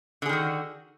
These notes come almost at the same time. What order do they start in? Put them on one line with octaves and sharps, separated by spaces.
D3 G#4 D#3 F#4